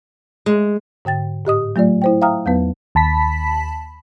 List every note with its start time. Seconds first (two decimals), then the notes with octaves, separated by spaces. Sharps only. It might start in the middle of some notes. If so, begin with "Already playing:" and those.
0.46 G#3
1.05 G#2 D3 G5 A6
1.45 A2 G4 D#5 D#6
1.76 F#3 A3 F4 D5
2.02 E4 C5 G5
2.21 E5 F5 G5 A#5 D#6 F6
2.46 E2 F#3 B3 B4
2.95 D#2 A5 B5 B6